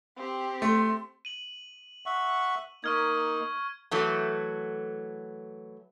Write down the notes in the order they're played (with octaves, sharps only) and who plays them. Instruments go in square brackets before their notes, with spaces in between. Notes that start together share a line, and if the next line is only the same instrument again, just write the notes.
[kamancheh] C4 G4
[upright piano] A3 [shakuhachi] C6
[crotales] D#7 F#7
[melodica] E5 F#5 C#6
[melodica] A#3 D#4 [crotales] C#6 F6 G#6
[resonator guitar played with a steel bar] E3 F#3 A3